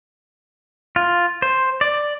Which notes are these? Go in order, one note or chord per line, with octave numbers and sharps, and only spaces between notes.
F4
C5
D5